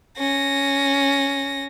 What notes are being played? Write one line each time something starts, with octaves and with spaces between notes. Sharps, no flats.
C#4 A#6